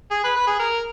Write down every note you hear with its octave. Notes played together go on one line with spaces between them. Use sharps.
G#4
B4
B4
G#4
A#4